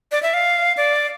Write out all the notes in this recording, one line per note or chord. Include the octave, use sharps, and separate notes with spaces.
D5
E5
F5
D5